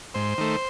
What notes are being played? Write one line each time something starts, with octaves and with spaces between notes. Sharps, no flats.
G#2 C5
D#3 A3